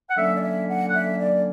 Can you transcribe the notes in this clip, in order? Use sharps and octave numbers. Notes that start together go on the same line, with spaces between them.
F#5
D3 F#3 A#3 C#4 E5
D5
E5
F#5
F#5
E5
D5